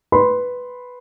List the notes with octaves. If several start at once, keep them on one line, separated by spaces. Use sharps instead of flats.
B4 B5 C6